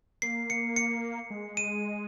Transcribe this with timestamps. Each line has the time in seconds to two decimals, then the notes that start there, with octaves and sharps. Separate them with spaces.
0.22 A#3 C7
0.50 C#7
0.76 C#7
1.30 G#3
1.57 D#7